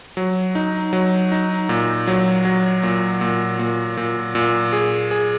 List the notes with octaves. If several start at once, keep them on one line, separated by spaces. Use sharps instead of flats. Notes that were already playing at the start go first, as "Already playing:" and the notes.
F#3
D#4
F#3
D#4
A#2
F#3
F#3
A#2
A#2
A#2
A#2
A#2
G#4
G#4